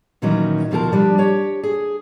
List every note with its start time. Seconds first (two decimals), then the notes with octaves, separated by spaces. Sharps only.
0.22 A#2 D#3 E3 F#3 C#4 D#4
0.71 D2 B2 F3 G4 A#4 A5
0.92 F3 G3 D4
1.18 G4 C#5
1.63 G#4